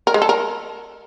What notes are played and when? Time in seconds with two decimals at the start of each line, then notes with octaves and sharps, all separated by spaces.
0.07 A#4
0.14 G#3
0.22 A4
0.29 A#4